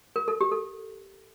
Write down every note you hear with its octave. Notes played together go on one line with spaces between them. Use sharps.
A#4
A4
G4
A4